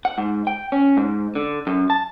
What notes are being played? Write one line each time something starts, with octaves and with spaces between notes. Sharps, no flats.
F#5
G#2
G5
C#4
G#2
D3
F#2
A5